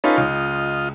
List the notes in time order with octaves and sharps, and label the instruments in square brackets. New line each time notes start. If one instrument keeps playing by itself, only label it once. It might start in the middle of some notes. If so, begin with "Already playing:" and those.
[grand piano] C#4 D#4 F4 [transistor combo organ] A4 B4
[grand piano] C#2 [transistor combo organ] F4 D#5